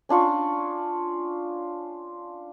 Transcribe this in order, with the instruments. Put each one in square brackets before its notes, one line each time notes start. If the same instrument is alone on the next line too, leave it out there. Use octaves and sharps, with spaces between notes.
[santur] C#4 D4 F4 C#6